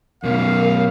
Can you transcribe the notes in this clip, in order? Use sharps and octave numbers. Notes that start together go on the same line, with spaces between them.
F#2 B2 A#4 F5